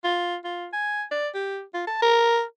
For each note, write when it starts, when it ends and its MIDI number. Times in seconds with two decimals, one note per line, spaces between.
0.04 0.37 65
0.45 0.67 65
0.73 1.04 80
1.11 1.28 74
1.34 1.62 67
1.74 1.83 65
1.87 2.01 81
2.02 2.43 70